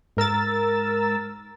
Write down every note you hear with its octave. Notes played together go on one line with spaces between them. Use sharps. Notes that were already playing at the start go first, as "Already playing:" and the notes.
G#2 A#4 E6 A6